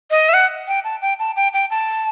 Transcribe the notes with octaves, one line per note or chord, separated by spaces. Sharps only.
D#5
E5
F#5
G5
A5
G5
A5
G5
G5
A5